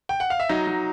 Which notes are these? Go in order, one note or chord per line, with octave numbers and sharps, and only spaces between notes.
G5
F#5
F5
E5
F#3 D#4 D#5
F#3